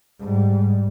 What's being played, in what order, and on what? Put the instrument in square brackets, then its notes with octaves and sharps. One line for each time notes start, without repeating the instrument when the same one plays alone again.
[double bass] G#2 G3